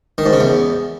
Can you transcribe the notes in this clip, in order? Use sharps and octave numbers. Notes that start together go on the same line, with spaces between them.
D#3
G#2
C#3
E2